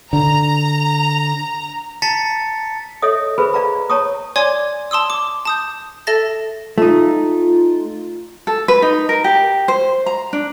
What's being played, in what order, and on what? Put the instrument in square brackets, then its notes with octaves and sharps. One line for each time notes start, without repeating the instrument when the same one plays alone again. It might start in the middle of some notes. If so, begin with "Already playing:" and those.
[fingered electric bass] D3 [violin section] A#5
[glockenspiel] A5 A#5 A6 B6 C#7
[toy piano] A4 C#5 D#5 E5 D#6
G#4 B4 C5 B5
D5 F5 A#5 B5
C#5 A5 A#5 C#6 D#6
[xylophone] C#5 D5 G#5 C6 D6 G#6
A5 C6 D#6 E6
D6
A5 D#6 G6
A4 E5 A5 A6 A#6
[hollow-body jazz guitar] A3 D#4 [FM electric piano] F4
[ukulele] A4
B4
D#4
A#4
G4
C5
A#5
D4